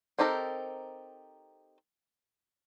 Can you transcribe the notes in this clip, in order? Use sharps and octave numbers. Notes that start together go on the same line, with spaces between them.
C4 D#4 G4 A4 A#4